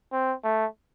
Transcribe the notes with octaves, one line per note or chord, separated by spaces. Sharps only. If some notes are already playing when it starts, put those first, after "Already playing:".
C4
A3